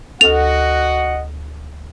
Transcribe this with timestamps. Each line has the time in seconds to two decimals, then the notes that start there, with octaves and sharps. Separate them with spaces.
0.21 D2 F#4 A4 D#5 F#5 F7